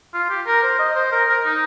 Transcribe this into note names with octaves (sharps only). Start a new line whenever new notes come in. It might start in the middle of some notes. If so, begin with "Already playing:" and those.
F4
G4
A#4
C5
D#5
C5
A#4
A#4
D#4